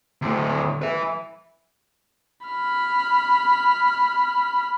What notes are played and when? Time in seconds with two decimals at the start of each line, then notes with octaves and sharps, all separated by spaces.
0.22 D2 A2
0.82 B4 E5
2.47 B5 F6